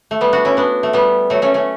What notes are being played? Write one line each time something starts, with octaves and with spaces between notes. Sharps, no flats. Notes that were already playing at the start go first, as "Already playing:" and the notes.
A3
G3 B3
D4 F#4
C#4 E4
B3 D4
A3
G3 B3
F#3 A3
A3 C#4
A3 C#4